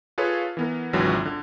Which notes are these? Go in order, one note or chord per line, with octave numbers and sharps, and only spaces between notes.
F4 G#4 A4 B4 C#5 F5
E3 B3 A#4
G#1 C#2 D3 E3 F#3
D3